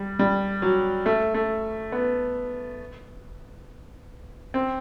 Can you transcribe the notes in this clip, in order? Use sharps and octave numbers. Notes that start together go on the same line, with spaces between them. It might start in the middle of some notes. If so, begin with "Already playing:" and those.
Already playing: G3
G3
F#3
A3
A3
B3
C4